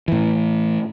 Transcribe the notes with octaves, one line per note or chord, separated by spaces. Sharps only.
A2 E3